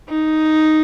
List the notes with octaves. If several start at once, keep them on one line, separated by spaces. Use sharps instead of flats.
D#4